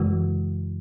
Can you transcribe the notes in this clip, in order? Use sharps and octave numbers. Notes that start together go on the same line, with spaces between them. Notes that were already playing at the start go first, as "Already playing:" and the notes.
Already playing: F#2 C#3 E3 G#3 E4 F#4